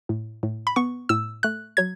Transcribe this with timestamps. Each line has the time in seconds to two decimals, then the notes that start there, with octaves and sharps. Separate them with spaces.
0.09 A2
0.43 A2
0.67 B5
0.76 B3 C#6
1.09 A2 E6
1.43 A3 F#6
1.77 F#3 G#6